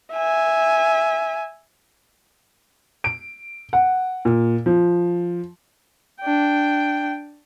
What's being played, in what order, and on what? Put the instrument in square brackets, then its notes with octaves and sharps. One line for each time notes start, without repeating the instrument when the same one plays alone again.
[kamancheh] E5 G#5
[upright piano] D7
F#5
A#2
F3
[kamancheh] D4 G5